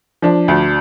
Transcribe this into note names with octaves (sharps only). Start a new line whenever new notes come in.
F3 D4
D2